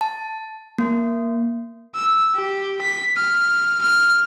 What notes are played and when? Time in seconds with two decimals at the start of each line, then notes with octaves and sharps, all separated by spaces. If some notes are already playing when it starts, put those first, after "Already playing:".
0.01 A5
0.78 A#3
1.95 E6
2.35 G4
2.82 B6
3.17 F6
3.82 F6